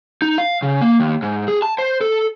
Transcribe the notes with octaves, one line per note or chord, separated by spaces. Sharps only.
D#4
F5
C#3
A#3
D#2
G#2
G#4
A5
C5
A4